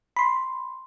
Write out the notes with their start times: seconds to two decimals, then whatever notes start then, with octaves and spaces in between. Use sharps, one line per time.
0.17 B5 C6